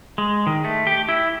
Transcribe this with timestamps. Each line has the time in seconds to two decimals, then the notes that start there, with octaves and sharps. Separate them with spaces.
0.18 G#3
0.47 D#3
0.64 A3
0.87 G4
1.09 E4